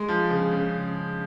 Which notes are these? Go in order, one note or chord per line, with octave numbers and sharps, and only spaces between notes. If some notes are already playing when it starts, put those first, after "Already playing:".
Already playing: G#3
F3
C#3
C#3